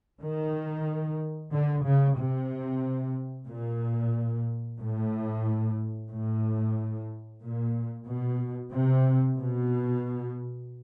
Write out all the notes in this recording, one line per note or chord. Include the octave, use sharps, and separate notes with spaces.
D#3
D3
C#3
C3
A#2
A2
A2
A#2
B2
C3
B2